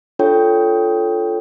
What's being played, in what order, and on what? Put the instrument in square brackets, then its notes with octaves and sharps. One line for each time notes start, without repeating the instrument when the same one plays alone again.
[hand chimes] D4 F4 A4 C#5 G5